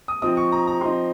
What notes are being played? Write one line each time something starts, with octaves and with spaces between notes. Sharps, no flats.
D#6
F3 C4 D#4 D#6
C#6
A#5
A#5
F3 C4 D#4 C6